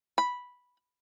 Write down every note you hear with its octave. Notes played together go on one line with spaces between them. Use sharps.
B5